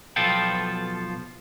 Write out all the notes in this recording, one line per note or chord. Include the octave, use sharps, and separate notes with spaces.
B1 B2 F3 F4 A4 G5